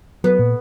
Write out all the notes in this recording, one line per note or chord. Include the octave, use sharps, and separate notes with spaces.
F#3 B3
A#2